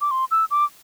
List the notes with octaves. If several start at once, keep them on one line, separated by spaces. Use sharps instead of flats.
D6
C6
E6
D6